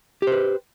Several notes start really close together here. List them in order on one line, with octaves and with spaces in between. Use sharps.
G4 C5 B4